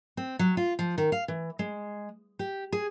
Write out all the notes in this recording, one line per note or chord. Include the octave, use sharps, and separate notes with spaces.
C4
F#3
F4
F3
D#3
F5
E3
G#3
G4
G#4